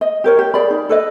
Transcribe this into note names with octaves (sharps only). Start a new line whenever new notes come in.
D#5
G4 A#4 C#5
G4
G#4 D5 B5
D#4
A4 B4 D#5